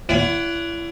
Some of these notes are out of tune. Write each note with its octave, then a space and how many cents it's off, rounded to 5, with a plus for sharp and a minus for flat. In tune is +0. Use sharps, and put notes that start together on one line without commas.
E4 +30 D5 -45 F#5 +0